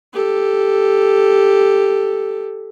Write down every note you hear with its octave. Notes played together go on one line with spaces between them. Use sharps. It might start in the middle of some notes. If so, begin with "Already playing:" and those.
G4 A4